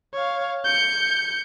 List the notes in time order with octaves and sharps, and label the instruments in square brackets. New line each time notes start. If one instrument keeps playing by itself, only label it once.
[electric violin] C#5 F5
G6 C#7